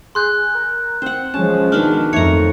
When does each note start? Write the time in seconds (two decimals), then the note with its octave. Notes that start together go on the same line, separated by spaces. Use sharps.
0.15 G#4 C6 F#6 G6
0.55 A#4
1.02 C4 C5 F#5
1.34 F3 G#3 C#4 A5
1.72 B2 D#3 D4 F6
2.13 F2 A3 C#5 A#5 C#7